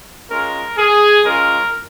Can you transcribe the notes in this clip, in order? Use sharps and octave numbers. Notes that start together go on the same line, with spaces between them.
G#3 C#4 F4 A#4
G#4
G#3 C#4 F4 A#4